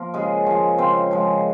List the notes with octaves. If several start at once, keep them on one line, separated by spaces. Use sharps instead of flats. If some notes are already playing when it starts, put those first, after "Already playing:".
Already playing: F3 A#3 F4 A#4
C#3 G#3 G#4
F3 G#3
C#3 C4 C5
F3 G#3